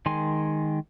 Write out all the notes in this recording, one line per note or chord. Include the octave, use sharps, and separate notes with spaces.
D#3 G#3 G#5 C6